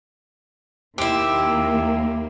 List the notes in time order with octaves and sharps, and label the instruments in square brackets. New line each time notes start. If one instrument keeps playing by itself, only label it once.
[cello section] D#2 A#3 [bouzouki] C4 E4 [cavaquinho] G4